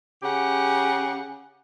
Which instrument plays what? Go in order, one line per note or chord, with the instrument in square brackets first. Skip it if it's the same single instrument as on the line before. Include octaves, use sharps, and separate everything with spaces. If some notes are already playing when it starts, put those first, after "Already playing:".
[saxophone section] C#3 G4 F#5